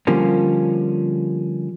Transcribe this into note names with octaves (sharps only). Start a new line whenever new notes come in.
D3 F3 G3 A#3 C#4